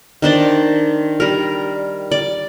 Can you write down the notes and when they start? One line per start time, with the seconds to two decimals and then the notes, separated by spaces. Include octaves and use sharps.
0.22 D#3 D4 C5 D5
1.20 G3 A#4
2.12 D5